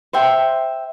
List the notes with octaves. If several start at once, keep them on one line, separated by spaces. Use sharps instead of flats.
C5 E5 G5